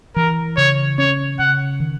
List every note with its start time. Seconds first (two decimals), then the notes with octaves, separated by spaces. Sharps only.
0.16 E3 A#4
0.57 C#3 C#5
0.98 C#4 C#5
1.39 C#3 F#5
1.80 D#3